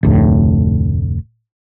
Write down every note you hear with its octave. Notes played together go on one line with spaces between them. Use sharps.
F1 D2 A2